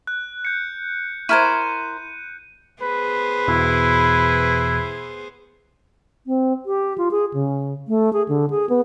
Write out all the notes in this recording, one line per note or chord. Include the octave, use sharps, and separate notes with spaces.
F#6
G6 C#7
E4 A#4 C5 C#6 F6 G#6 D#7
B3 G#4 B4 C5
E2 B2 E3 E4
C4
G4
F4
G#4
C#3
A3
G#4
D3
G#4
B3